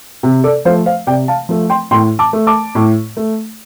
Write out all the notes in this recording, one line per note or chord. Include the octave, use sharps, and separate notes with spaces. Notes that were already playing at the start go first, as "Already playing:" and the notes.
C3
A4 D5
F3 A3 C5 F5
C5 F5
C3 D5 G5
F5 A5
F3 A3
G5 C6
A2 G5 C6
A5 D6
A3
A5 D6
A2
A3